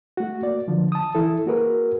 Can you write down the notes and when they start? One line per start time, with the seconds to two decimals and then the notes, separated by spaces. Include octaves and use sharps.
0.17 A3 F#4
0.42 A#3 D5
0.68 D3 F3
0.92 A5 D#6
1.15 E3 E4 A4
1.46 A#3 F#4 G#4 A#4 B4